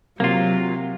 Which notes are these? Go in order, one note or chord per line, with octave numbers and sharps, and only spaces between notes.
C3 F#3 A#3 F4